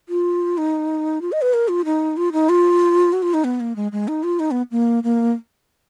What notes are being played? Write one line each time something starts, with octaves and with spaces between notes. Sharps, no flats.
F4
D#4
F4
D#5
B4
A#4
F4
D#4
F4
D#4
F4
F#4
F4
D#4
B3
A#3
G#3
G#3
D#4
F4
D#4
B3
A#3
A#3